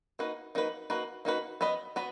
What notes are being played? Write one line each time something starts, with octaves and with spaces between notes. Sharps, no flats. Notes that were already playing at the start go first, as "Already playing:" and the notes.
A#3 D#4 F#4 B4
A#3 D#4 F#4 B4
A#3 D#4 F#4 B4
A#3 D#4 F#4 B4
B3 F#4 B4 D#5
B3 F#4 B4